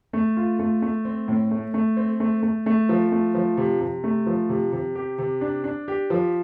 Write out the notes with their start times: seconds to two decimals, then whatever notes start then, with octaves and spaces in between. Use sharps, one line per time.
0.13 A3
0.37 F4
0.59 A3
0.82 A3
1.05 C4
1.28 A2
1.51 A3
1.74 A3
1.97 C4
2.20 A3
2.43 A3
2.66 A3
2.89 F3
3.12 A3
3.35 F3
3.57 C3
3.81 C3
4.04 A3
4.27 F3
4.49 C3
4.73 C3
4.95 G4
5.18 C3
5.41 D4
5.64 D4
5.88 G4
6.10 F3